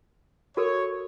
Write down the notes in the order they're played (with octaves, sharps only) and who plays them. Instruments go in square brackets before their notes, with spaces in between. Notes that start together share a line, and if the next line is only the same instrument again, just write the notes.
[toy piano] F#4 A4 A#4 [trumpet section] C#5